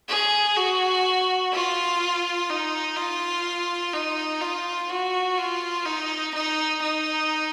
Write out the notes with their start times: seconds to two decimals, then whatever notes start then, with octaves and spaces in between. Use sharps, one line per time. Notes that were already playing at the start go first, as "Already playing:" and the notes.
0.08 G#4
0.56 F#4
1.52 F4
2.49 D#4
2.97 F4
3.94 D#4
4.41 F4
4.89 F#4
5.38 F4
5.85 D#4
6.34 D#4
6.82 D#4